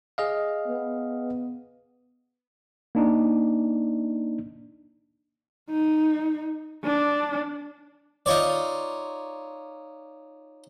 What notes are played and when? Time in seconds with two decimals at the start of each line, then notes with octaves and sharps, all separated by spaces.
0.18 G#4 D#5 F5
0.66 B3
2.95 A#3 D4 D#4
5.70 D#4
6.84 D4
8.26 D#4 F4 C#5 D5